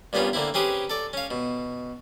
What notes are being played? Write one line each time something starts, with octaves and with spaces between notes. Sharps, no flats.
G2 A#2 B3 C#4 F4
D3 A#3 C4 E4
C4 C#4 G4 G#4 B4
A4 D5
C#4 F5
B2